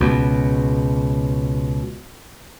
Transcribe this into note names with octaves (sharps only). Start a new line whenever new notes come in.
C#2 B2